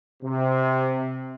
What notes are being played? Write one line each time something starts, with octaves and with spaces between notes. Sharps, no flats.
C3